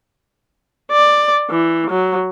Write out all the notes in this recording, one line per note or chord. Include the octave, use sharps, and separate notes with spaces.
D5
E3
F#3